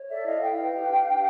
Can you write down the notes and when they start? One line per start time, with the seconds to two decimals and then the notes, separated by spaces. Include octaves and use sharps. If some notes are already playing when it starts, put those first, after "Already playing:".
Already playing: C#5
0.09 A4 D5 E5
0.25 E4 D#5 F5
0.41 E4 F5 G5
0.58 B4
0.74 G4
0.90 D4
1.07 D4